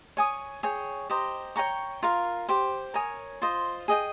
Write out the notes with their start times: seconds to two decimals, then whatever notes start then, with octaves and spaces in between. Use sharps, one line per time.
0.17 C#5 G#5 D#6
0.63 G#4 C#5 G5
1.10 G4 C5 D#5 A#5
1.56 C#5 G5 A#5 C#6
2.03 F4 A#4 F5
2.49 G4 C5 G5
2.94 A#4 C#5 G#5 D#6
3.42 F4 C5 D#5
3.88 G#4 D#5 G5